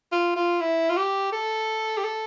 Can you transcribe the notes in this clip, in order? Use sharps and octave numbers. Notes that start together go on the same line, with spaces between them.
F4
F4
E4
F4
G4
A4
G4
A4